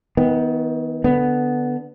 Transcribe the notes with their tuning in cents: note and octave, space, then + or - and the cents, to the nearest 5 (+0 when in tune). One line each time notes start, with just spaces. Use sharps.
D#3 +35 B3 +0
D3 +0 B3 +0